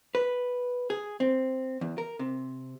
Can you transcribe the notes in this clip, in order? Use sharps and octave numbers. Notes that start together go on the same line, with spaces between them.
B4
G#4
C4
E2
A#4
C3